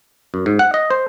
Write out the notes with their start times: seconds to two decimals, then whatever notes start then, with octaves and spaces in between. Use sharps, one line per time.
0.34 F#2
0.46 G#2
0.59 F#5
0.74 D#5
0.90 C5